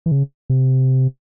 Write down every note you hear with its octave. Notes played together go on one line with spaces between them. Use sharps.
E3
C#3
C3